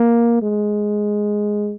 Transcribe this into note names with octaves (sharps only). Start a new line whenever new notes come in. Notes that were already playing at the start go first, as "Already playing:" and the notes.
Already playing: A#3
G#3